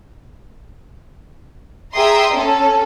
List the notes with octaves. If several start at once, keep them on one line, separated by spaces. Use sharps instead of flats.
G#4 E5 G5 A#5 C6 D#6
C#4 A4